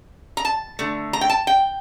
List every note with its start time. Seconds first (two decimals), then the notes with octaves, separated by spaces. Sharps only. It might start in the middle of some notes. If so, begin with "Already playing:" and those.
0.37 A#5
0.45 A5
0.79 D3 A3
1.13 A#5
1.21 G5
1.29 A5
1.47 G5